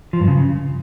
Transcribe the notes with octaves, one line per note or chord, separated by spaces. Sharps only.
F3
G2
C#3